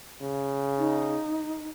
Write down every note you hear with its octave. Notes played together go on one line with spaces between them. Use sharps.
C#3
D#4